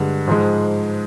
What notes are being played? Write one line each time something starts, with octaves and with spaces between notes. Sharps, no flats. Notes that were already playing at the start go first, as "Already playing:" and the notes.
Already playing: G2 D3 G#3
G#2 F3 G#3